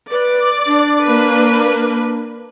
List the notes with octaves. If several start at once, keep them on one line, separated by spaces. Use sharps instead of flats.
B4 D5
D4
A#3 B4